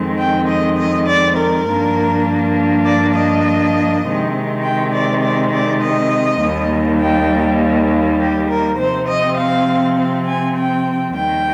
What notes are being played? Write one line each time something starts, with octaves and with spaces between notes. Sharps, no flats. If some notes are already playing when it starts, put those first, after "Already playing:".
Already playing: F2 D#3 G#3 C4
G5
D#5
D#5
D5
A#4
G2 F3 A#3 D4
D5
D#5
C3 D#3 G#3 C4
G5
D5
D5
D5
D#5
D#2 D#3 G3 A#3
G5
G4
A#4
C3 F3 C4 C5
D#5
F5
F5
G#5
G5
D#2 D#3 G3 G5